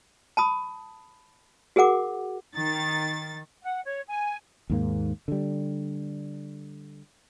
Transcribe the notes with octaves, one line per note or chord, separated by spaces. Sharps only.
A5 B5 D#6
F#4 G#4 A#4 F#5 D6
D#3 A6
F#5
C#5
G#5
D#2 G#2 A#3
D3 G3